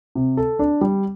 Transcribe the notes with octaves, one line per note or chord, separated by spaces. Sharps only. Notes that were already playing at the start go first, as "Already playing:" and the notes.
C3
A4
D4
G3